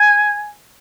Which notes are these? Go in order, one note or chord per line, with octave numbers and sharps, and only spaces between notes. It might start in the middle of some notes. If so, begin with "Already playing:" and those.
Already playing: G#5